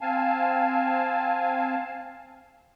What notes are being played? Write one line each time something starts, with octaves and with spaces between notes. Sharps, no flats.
C4 F5 G#5 A5